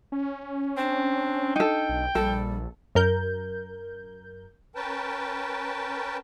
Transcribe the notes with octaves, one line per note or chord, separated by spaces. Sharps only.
C#4
C4 D4
D#4 A4 G5
B1
A#1 G3 A4
F#2 A#4 G6
C#4 A#4 B4 G5 A5